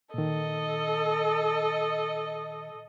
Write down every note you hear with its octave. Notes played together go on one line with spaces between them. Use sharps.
A#2 D#3 A4 D#5